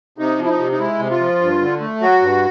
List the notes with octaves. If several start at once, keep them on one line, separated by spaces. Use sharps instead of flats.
C3 D#4
F3
E4
D#4
C3
D#4
G#3 E4
C3
F4
F3
G2
D3
A3
F#3 F#4
G2